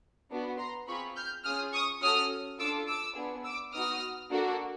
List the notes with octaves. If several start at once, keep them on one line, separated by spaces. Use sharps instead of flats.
B3 D4 F#4
A#5 C6
C4 F4 G#4 B5 C#6
F6 G6
C#4 F4 G#4 D#6 F6
C#6 D#6
C#4 F#4 A4 D#6 F6
D4 F4 A4 D6 E6
D6 E6
B3 D4 F4 G#4
D6 E6
B3 D#4 F#4 D#6 F6
A#3 D4 F#4 A4